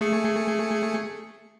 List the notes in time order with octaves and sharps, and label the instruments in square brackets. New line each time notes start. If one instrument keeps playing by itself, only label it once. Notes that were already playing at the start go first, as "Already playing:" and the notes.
[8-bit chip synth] A3 G#4 C#7